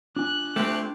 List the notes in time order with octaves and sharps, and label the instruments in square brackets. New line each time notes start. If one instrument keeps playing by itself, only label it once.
[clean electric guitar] D4 F4 G#5 [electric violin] F#6
[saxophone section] D2 C4 G4 [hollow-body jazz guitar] A3